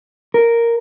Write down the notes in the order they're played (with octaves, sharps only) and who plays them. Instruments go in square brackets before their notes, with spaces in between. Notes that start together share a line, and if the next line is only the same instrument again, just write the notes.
[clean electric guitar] A#4